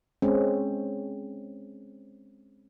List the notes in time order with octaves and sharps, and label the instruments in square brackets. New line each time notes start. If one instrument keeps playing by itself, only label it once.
[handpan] G#3 C4 C#4